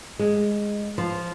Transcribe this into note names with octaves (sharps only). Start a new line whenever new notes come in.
G#3
F3